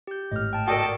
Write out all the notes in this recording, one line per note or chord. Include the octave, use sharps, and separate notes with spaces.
G4 G6
G#1 A2 D#5 F6
G5 A5
F#4 A4 A#4 D5 D#5 G5 A5 D7